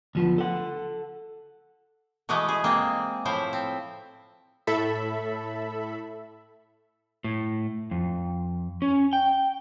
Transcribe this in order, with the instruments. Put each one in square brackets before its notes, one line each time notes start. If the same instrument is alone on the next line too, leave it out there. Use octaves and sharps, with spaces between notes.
[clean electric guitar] D2 F3 B3
A4 F#5
[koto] B2 E3 G#3 A3 B3
G#4
G#3 A#3 C4
A2 F3 E4 C5 E5
C4
[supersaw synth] A2 A4 E5 B5
[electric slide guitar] A2
F2
C#4
G5